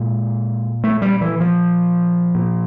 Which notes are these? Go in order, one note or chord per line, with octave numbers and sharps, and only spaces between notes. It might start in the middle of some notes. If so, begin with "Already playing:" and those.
Already playing: A#2 G#3
A3
G3
E3
F3
A#2